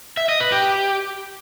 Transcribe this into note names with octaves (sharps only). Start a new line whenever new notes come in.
E5
D#5
B4
G4